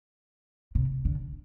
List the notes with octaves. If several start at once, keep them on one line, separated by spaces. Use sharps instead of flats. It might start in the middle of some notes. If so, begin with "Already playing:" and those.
C3
D3